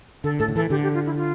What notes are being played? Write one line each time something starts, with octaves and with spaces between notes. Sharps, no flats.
D3 A4
A2 A4
D3
E3 A4
D3 G4
G4
F4
E4
F4